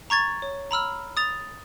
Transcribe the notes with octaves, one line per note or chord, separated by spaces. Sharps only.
A#5 C#6 G#6 A6
C#5
A#5 B5 E6 F6
D#6 A6 F7